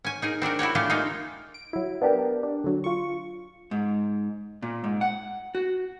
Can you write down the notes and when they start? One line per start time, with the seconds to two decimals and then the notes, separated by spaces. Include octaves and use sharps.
0.05 C#4 G#5
0.22 D#4 G#4 A#4
0.42 C4 D4 F#4 A#4
0.59 E4 F#4 G4 C#5
0.75 A3 C#4 D4 F4 G4
0.90 G#3 A#3 C#4 D#4 F4
1.54 D7
1.73 F#3 E4
2.02 B3 D4 G4 A#4
2.43 D4
2.64 D3 F#3
2.84 F4 C#6
3.71 G#2
4.62 A#2
4.84 G#2
5.01 F#5
5.55 F#4